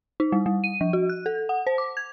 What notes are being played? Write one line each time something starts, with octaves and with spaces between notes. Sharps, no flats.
D#4
G3
G3
D#7
F3
F#4
F#6
A4
F#5
C5
D6
G#6